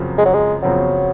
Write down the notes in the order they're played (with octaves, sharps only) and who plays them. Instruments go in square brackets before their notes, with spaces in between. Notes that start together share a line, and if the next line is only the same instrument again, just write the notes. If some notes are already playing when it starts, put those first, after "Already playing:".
Already playing: [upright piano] F#2 C#3 F3 C4 F#4
[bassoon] G#3
F#3
G#3
[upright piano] F#2 C#3 F3 C4 F#4 [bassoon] F#3